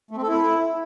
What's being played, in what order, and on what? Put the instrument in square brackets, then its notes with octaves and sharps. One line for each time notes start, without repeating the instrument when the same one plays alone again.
[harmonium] A3
C4
A4
E4